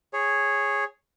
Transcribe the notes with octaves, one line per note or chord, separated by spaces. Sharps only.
G#4 C#5